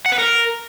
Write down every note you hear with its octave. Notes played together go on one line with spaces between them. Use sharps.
F#5
B4
A#4